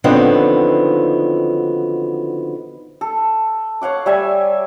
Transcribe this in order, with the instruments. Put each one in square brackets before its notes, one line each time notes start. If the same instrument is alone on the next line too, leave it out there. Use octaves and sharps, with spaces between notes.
[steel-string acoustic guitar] D3 D#3 F3 F#3 B3 C4
[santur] A4
C#5 F5 F#5 D6
G3 E5 G#5